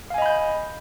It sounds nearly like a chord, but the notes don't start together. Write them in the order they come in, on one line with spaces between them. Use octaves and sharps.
F5 G#5 D#5 B5 G6